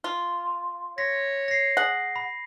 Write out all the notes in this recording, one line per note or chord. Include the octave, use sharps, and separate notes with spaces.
F4
C#5 A#6 B6
A#6 C7
G#4 F#5
B5